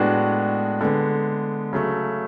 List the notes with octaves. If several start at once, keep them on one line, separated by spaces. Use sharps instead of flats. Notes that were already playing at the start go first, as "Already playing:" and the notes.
Already playing: A2 G#3 B3 D4 F#4
D3 G#3 B3
C#3 F#3 A3